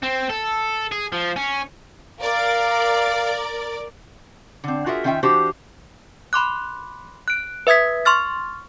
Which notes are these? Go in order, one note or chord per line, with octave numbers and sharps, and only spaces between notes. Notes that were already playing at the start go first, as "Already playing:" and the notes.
C4
A4
G#4
F3
C#4
A#4 D5 F5
D3 C4
F4 F#4 G#4 A#4 E5
D#3 C#4 F4 E5 G5
E3 D4 F#4 G4 C5
B5 C6 D6 F#6
F#6 D7
B4 E5 D#6 G#6 B6
C6 C#6 F6 A6